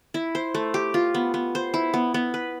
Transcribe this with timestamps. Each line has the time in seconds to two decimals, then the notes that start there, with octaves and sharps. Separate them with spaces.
0.14 E4
0.35 C5
0.54 A3
0.74 G4
0.94 F4
1.14 B3
1.34 B3
1.55 C5
1.74 E4
1.94 B3
2.14 B3
2.34 B4